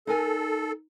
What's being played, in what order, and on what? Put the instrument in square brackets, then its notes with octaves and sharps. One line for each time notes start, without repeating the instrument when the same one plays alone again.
[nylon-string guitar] D#4 A#4 G#5 [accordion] A4